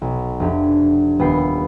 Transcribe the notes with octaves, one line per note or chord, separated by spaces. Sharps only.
B1
F1 D4 G4
D#1 B3 G5 C7